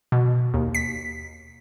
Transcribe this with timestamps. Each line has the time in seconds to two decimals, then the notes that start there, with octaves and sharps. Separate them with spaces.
0.12 B2
0.54 D#2
0.74 B6